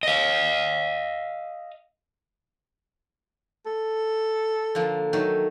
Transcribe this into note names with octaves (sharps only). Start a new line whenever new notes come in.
D#5 F5
A4
D3 F3 A#3
D#3 F#3 A3